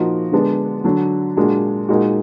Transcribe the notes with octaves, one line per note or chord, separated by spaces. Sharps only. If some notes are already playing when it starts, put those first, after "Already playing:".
Already playing: A#2 F3 A#3 D#4 F#4
D3 G#3 B3 D4
D3 F#3 D4
A#2 G#3 D4 F#4
A#2 G#3 D#4 F#4